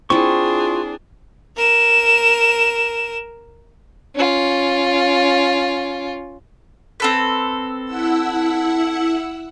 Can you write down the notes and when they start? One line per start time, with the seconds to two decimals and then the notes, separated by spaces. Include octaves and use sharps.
0.10 C4 D4 E4 F4 G#4 C#6
1.57 A#4 E7
4.15 C#4 F4
7.00 C4 A4 B4
7.85 E4 F#5 E6